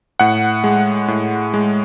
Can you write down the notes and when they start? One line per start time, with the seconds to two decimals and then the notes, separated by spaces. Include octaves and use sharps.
0.20 A2 F#5
0.64 G#3
1.08 A2
1.54 G#3